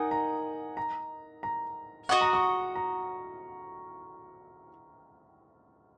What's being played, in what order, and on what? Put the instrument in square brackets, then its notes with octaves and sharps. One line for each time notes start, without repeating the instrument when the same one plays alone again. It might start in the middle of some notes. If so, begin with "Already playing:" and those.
Already playing: [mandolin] D#4 A#4 D#5 [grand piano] F#5 G#5
[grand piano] A#5
A#5
A#5
[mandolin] F#4 D#5 F#5 [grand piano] C#6
[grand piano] A#5
C#6
A#5